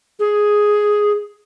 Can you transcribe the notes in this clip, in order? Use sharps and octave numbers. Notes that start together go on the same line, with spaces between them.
G#4